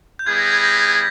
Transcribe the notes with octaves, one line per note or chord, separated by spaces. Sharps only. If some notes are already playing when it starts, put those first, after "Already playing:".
G6
G3 B3 E4 G#4 G#6
A#6
G#6
A#6
B6